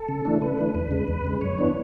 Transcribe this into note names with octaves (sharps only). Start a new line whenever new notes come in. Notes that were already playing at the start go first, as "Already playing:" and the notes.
Already playing: A4
C#3
E3 A3 D4
C#3 B4
E3 A3 D4
E2 B4
C#3 G#3
E2
C#3 G#3
F#2 C#5
E3 B3 D4